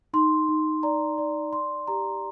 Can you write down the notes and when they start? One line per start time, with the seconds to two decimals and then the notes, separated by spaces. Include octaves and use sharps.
0.13 D#4 C6
0.49 D#4
0.83 D5 A#5
1.18 D5
1.53 D5 C6
1.87 G4 A#5